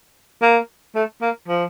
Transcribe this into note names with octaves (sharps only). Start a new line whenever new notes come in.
A#3
A3
A#3
F3